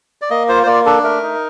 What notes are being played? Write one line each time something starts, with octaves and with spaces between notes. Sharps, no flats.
D5
A#3 D#5
F4 C5
C5
A#3 D5
D4 A4
A3 A#4
D#4